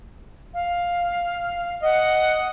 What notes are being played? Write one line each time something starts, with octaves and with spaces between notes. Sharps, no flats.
F5
D#5 F#5